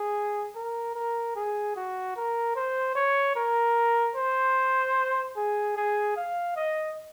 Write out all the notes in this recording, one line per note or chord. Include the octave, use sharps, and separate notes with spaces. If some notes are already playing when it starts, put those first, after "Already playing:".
Already playing: G#4
A#4
A#4
G#4
F#4
A#4
C5
C#5
A#4
C5
G#4
G#4
F5
D#5